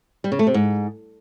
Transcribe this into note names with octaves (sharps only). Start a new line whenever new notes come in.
G3
C#3
A3
C3
G#2